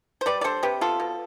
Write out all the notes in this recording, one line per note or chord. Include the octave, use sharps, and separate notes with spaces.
C5
G3 B4 D5
D5
D4 A4 C5
C3 G4 B4
B3 F4 A4
B2